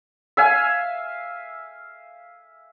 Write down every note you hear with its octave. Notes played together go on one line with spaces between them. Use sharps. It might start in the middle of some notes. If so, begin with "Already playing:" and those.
E5 F5 G#5